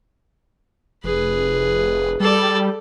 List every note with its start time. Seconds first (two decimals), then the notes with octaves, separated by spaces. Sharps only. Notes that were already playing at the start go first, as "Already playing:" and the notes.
1.04 F1 G#4 B4
2.20 G3 A4 D5